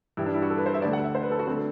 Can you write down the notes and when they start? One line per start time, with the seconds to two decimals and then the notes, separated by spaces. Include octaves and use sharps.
0.17 G2 E3 G3 E4
0.26 D4
0.34 E4
0.42 F#4
0.50 A4
0.58 B4
0.66 C5
0.74 E5
0.82 D2 D3 A3 D5
0.93 F#5
1.04 E5
1.15 C5
1.23 B4
1.31 A4
1.39 F#4
1.47 C4
1.50 D3 A3